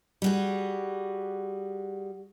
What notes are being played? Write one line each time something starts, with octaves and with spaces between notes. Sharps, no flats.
G3 F#4 G#4